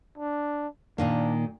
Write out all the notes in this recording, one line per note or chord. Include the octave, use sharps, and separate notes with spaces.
D4
A#2 D#3 A#3 D4